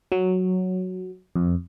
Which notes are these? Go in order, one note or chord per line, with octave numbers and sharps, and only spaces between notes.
F#3
F2